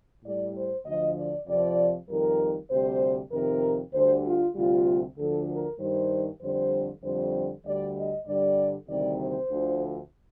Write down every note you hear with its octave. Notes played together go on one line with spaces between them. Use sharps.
A2 G3 D5
C5
D2 D3 F3 D#5
D5
F2 C3 F3 D5
F2 D#3 G3 A#4
D2 C3 G3 C5
F2 C3 D#3 A#4
D2 D3 G3 C5
F4
D2 C3 G3 F4
D2 D3 F3 A4
A#4
G2 D#3 G3 C5
F2 D3 G3 C5
F2 D3 G3 C5
D2 D3 G3 D5
D#5
G2 D3 G3 D5
D2 C3 D#3 G3 D5
C5
D2 D3 F3